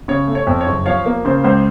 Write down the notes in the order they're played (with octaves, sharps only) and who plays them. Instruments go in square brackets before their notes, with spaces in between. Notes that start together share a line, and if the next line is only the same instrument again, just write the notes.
[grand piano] C#3 C#5
A3
C#5
F2
C#5
F#1
F3 C#5 F5
A#3
C#3 C5
C#2 C5